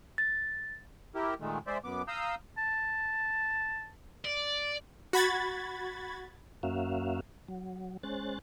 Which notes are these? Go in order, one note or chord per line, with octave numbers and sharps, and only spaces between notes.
A6
E4 G4 A#4
A#2 D#3 G#3 A3
G#3 C5 D5 E5
F#2 B3 D6
F5 A#5 D#6 E6 G6
A5
D5
F#4 B5 G#6 A6
F#2 A#3 C#4 F#4 E5 F5
F#3
G#3 C#4 C5 F#6 A6